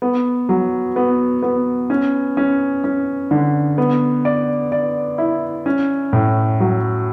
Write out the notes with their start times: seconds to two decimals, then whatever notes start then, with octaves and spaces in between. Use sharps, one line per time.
0.02 B3
0.49 F#3
0.96 B3
1.42 B3
1.90 C#4
2.37 C#4
2.84 C#4
3.31 D3
3.78 B3
4.25 D5
4.72 D5
5.18 E4
5.66 C#4
6.13 A2
6.60 F#3